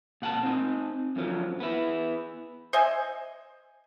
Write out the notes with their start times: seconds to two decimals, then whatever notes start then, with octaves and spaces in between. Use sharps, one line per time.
0.22 A#2 F#5 G#5 A5
0.43 C4 D#4
1.16 F#2 D3 F3 F#3
1.60 B3 E4
2.73 C5 D#5 E5 G#5